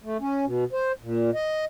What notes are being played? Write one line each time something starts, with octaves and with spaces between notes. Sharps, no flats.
A3
C#4
B2
C5
A#2
D#5